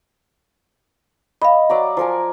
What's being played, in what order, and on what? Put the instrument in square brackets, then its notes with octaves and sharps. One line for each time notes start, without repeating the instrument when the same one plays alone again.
[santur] D#5 [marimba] F5 B5
[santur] F#3 D5 A#5
F3 A#4 G#5